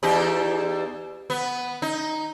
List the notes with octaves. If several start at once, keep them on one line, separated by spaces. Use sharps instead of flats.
E2 D#4 G4
B3
D#4